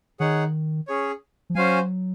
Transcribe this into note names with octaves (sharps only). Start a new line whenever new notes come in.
D#3 D#4 G#4 C#5 F#5
C#4 G#4 C#5
F3
F#3 C#4 F#4 C5 F5 G#5